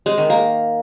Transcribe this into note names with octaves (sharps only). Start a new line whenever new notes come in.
G#3
D#3
A#3